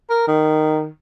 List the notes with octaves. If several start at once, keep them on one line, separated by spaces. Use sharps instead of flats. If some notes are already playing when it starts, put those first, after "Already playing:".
A#4
D#3